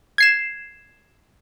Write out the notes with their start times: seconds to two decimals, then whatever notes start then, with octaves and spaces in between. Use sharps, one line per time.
0.18 G#6 C7 E7